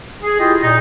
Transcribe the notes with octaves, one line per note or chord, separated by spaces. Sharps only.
G#4
E4 F4 G4 D#5 G5
A#2 D#4